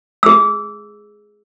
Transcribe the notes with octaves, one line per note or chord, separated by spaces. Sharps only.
G#4 E6